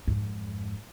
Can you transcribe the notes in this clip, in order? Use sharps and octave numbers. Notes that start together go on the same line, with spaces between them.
F2 G#2